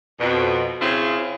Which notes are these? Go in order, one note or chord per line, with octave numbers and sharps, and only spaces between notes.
F2 B2
C#3 C4 C#4 E4 F4 G#4